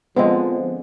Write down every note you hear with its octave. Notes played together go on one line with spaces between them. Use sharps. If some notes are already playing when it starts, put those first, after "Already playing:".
D3 F3 G#3 B3 C4 C5 D#5